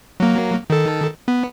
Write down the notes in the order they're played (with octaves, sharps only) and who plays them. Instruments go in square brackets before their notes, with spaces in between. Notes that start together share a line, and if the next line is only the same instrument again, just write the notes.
[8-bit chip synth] F#3 A#3
D#3 A4
B3